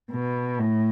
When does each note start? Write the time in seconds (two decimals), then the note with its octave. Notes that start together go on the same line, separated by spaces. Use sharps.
0.11 B2
0.59 A2